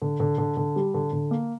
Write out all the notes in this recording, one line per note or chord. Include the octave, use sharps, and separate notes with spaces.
D3
D3
D3
D3
G3
D3
D3
A#3